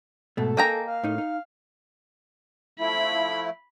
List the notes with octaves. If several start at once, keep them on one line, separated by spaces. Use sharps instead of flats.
G#2 B2 A3 A4
A#3 D#5 G5 G#5 A#5
F5
A2 D#4
D#4
F3 A3 E4 B5